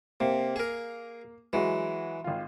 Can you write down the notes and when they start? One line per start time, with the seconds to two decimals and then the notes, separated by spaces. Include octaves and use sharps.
0.20 C3 A#3
0.56 G#4 A#4
1.53 E3 F#3 G#3 F#4
2.24 G#1 F4